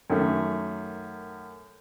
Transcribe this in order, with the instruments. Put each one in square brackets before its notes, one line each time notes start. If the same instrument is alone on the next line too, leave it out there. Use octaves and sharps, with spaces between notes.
[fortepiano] F#2 D#3 A3